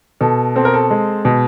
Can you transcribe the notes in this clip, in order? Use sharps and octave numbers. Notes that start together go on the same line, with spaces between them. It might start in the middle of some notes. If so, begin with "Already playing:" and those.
B2 A4
C4 A4
A#4
A4
G#3
B2